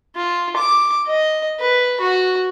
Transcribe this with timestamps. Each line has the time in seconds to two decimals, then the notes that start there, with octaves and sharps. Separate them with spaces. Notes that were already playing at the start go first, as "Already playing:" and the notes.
0.16 F4
0.57 D6
1.07 D#5
1.59 B4
2.01 F#4